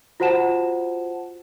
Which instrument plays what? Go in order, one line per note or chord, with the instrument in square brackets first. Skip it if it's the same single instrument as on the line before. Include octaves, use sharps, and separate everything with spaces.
[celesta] F4 F#4 C5 F#5 A5 E7